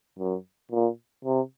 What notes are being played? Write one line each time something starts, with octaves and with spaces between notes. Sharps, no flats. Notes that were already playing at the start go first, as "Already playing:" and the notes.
F#2
A#2
C3